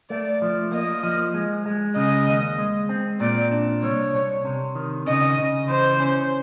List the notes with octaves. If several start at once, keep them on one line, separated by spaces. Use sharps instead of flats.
A3 D5
F3
A#3 D#5
F3
G#3
G#3
C#3 D#5
D#2
G#3
C4
A#2 D5
D4
C2 C#5
C2
C3
D#3
C#3 D#5
C#3
E3 C5
C#4